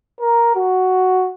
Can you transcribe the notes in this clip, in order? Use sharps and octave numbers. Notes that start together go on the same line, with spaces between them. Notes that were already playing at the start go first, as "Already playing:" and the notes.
A#4
F#4